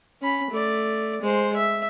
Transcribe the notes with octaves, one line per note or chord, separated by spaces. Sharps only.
C#4 B5
A3 D5
G#3 C5
E5